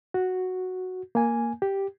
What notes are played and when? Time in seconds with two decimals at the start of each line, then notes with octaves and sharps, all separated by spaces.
0.14 F#4
1.15 A#3 G#5
1.62 G4